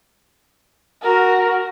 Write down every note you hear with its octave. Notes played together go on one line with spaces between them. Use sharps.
F#4 A#4